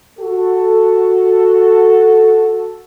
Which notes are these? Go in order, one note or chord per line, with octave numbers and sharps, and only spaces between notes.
F#4 A4